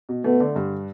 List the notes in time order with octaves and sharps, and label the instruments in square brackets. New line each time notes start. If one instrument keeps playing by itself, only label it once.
[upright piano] B2
[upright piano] A3 [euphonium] B3
[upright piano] D3
G2